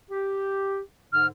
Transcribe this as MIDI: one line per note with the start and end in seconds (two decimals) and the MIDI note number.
0.11 0.80 67
1.13 1.27 44
1.13 1.27 50
1.13 1.26 89